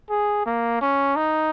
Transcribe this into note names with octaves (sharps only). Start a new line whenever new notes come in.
G#4
A#3
C#4
D#4